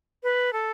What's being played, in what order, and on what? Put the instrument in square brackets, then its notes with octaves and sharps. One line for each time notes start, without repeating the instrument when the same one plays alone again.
[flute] B4
A4